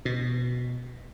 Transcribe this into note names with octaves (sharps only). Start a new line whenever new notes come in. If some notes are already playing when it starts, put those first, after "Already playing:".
B2